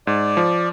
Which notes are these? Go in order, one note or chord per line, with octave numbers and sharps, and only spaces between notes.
G#2 D5
F3